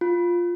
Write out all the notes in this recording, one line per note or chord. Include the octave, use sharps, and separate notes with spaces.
F4